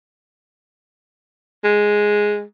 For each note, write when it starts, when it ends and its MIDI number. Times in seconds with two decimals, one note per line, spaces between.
1.64 2.42 56